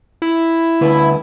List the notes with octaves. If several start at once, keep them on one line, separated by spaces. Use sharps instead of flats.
E4
D2 B4